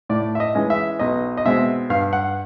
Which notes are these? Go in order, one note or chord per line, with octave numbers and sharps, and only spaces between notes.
A2 D5
E5
D#5
E3 G#3 C#4
E5
B1 D#5
D#5
B2 G#3 C4 E5
G2 F5
F#5